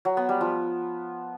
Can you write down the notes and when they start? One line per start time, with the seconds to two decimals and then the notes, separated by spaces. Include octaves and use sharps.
0.05 F#3
0.17 B3
0.29 G3
0.41 F3